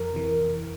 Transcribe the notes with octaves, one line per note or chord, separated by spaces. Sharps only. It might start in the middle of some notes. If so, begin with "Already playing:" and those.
Already playing: F2 A#4
C3 E3
F2